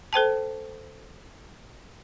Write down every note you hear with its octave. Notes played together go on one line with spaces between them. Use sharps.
A4 C5 G5 A5